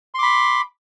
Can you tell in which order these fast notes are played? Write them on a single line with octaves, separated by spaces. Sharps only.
C6 D6 B5